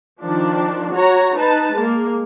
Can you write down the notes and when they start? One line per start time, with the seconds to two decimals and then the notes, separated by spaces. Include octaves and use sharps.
0.21 D#3 F3 D4
0.92 F#4 C#5 A#5
1.37 D#4 B4 A5
1.75 G#3 A#3